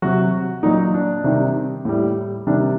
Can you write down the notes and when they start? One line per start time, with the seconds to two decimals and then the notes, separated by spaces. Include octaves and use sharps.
0.02 C3 F#3 F#4
0.63 A#2 F#3 D#4
0.94 D4
1.24 C3 D#3 G3
1.85 A2 G3
2.47 C3 D#3 G3 D4